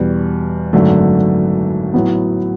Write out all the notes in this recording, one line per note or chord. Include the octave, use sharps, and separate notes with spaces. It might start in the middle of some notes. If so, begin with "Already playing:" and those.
Already playing: E2 B2 G3
G#1 F#2 D3 F#3 A3
A2 F#3 B3